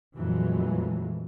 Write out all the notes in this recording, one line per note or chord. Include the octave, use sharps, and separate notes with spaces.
F2 A#2 E3 F#3 G#3 A3